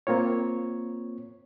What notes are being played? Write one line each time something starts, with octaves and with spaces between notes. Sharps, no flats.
A#3 C4 F4 C#5